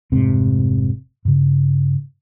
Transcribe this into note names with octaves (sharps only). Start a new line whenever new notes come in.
F1 G#2 C3 C4
G2 C#3